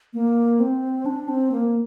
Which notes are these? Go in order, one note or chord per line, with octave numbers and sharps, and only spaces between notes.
A#3
C4
D4
C4
A#3